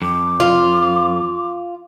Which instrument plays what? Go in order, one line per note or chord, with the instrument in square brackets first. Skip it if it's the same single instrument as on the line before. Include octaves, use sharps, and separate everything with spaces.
[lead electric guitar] F2 [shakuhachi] D6
[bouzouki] F4